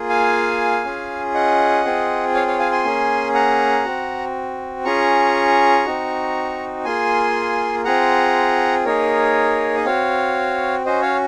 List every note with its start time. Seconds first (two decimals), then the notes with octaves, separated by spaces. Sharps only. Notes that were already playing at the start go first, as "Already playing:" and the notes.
Already playing: A#3 F4 G#4
0.09 F5 G#5
0.85 C#4 F4 G#4
1.34 D#5 F#5
1.85 C4 F4 G#4
2.34 C#5 F5
2.47 C#5 F5
2.59 F5 G#5
2.72 G#5 C6
2.84 A#3 C#4 G#4
3.34 F#5 A#5
3.85 C4 F#4
4.85 C#4 F4 G#4 A#5 C#6
5.85 C4 D#4 F#4
6.85 A#3 F4 G#4 G#5 C6
7.85 C4 F4 G#4 F#5 A#5
8.85 A#3 D#4 G#4 A#4 C#5
9.77 D#5
9.85 C4 F#4 C#5 F5
10.85 C#4 F#4 C5 D#5
11.02 C#5 F5